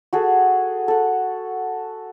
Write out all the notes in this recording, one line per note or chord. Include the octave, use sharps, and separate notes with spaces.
F#4 G#4 A4
A4 F#5